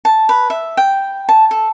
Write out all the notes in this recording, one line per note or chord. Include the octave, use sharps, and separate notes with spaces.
A5
B4
E5
G5
A5
A4